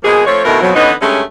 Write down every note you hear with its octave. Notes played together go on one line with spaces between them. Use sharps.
B2 F3 G#3 A#3 G#4
F3 A3 C4 C#5
D2 B2 D#3 A3 E4 A#4
F2 B2 F3 F#3
D3 E3 B3 C#4 D#4
G2 G#3 A3 C#4